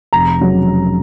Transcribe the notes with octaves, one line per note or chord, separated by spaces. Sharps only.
F1 A#5
C#3 F#3